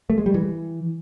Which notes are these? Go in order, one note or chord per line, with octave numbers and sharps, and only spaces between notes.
A3
G#3
G3
E3